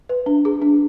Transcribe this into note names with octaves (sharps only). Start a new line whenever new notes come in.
B4
D4
G#4
D4